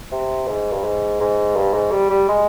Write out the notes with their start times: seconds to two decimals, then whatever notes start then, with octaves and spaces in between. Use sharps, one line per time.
0.12 C3
0.48 G#2
0.72 G2
0.84 G#2
1.20 G#2
1.56 G2
1.74 G#2
1.92 G3
2.10 G3
2.28 G#3